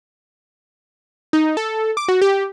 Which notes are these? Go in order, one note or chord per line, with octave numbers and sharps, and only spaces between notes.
D#4
A4
D6
F#4
G4